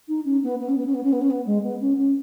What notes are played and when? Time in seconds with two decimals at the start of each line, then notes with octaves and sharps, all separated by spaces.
0.08 D#4
0.24 C#4
0.43 B3
0.60 B3
0.68 C#4
0.77 B3
0.86 C#4
0.94 B3
1.03 C#4
1.12 B3
1.21 C#4
1.30 B3
1.46 G#3
1.63 B3
1.80 C#4
1.97 C#4